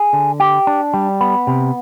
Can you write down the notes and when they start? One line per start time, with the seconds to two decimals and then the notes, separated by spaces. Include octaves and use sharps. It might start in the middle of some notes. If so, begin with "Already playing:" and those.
Already playing: G#4
0.13 D3
0.40 G4
0.67 D4
0.94 G3
1.21 B3
1.47 C3